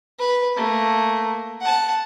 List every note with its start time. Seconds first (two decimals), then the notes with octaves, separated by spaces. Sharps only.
0.19 B4
0.57 A3 A#3
1.61 F#5 A5